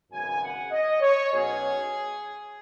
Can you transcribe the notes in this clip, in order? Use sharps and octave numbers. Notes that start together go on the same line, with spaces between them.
G#1 F#2 C#3 G#3 B3 G#5
F#5
D#5
C#5
B1 B2 F#3 C#4 G#4